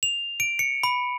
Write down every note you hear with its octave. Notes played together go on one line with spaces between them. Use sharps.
F7
D7
C#7
B5